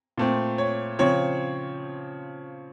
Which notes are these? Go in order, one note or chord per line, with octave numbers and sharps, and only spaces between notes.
A#2 A3 C4
C#5
C#3 F3 C4 C#5